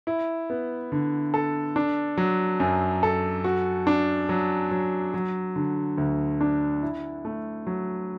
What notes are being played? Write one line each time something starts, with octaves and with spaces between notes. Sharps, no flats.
E4
B3
D3
A4
D4
F#3
F#2
A4
F#4
D4
F#3
F#3
F#3
D3
D2
D4
E4
A3
F#3